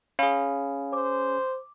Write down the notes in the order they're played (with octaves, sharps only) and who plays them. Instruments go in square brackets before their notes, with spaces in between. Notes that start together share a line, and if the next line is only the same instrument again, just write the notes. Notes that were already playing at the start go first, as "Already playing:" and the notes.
[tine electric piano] C#4 G#4 [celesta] F5 B5
[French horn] C5 [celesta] D6